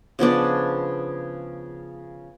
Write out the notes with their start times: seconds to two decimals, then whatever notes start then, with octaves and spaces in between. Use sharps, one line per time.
0.19 C#3 F3 B3 D4